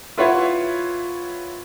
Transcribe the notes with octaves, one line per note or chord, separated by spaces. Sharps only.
E4 F4 B4 C#5 E5 F#5